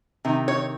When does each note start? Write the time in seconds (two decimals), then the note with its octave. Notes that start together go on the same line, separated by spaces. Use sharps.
0.25 C3 D#3
0.48 C#5